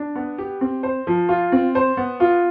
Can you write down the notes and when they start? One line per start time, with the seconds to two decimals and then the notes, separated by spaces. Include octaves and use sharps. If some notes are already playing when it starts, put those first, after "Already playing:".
Already playing: D4
0.15 B3
0.38 G4
0.61 C4
0.83 C5
1.07 F3
1.29 F4
1.52 C4
1.75 C5
1.97 B3
2.20 F4